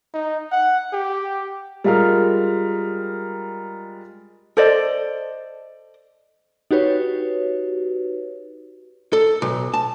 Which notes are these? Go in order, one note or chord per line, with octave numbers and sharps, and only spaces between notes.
D#4
F#5
G4
G3 G#3 F4 A#4 F6
A4 C5 D5 D#5
D#4 F#4 G4 B4 C#5
A4
B1
A5